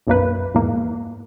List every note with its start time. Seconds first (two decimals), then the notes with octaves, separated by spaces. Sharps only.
0.07 B1 F#2 A#3 B4
0.54 E2 G#2 A#3